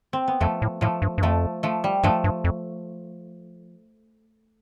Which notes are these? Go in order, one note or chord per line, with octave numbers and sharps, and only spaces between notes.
C4
B3
F2 F3 A3
A2
A2 F3 A3
G2
G2
F2 F3 A3
F3 A3
G3
G2 F3 A3
G2
F2